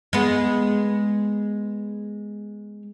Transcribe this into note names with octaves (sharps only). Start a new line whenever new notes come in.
G#3 B3